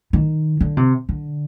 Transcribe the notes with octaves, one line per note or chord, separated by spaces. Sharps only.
D#3
D3
C3
D3